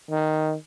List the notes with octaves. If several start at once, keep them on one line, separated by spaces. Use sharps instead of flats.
D#3